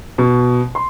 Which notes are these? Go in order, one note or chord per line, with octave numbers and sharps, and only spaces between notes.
B2
C6